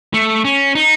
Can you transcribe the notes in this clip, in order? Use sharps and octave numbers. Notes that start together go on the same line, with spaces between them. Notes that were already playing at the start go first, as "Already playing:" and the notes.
A3
C#4
D#4